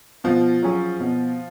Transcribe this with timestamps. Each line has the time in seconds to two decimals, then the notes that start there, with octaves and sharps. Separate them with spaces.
0.24 B2 F3
0.63 F#3 C#4 G#4
1.00 B2